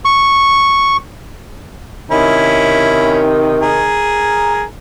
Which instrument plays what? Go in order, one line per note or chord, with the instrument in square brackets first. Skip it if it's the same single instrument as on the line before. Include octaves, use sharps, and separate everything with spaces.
[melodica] C#6
[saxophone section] C3 D#3 [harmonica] C#4 E4
[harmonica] G#4 A#4